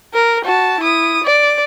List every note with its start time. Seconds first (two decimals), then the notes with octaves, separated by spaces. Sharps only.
0.14 A#4
0.44 F#4 A5
0.80 E4 D#6
1.24 D5